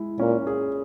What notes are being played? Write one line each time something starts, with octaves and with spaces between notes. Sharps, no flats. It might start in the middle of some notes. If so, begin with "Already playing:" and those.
Already playing: G#3 E4
A#2 C#4
G#4